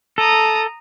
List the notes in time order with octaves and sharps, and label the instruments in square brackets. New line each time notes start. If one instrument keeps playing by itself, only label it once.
[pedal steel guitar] A4 [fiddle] A#5 D#6